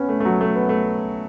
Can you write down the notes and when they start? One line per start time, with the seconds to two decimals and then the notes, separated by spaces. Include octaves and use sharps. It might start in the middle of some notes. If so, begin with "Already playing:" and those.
Already playing: B3 C#4
0.09 A3
0.20 A3
0.25 F#3
0.41 A3
0.55 B3
0.69 A3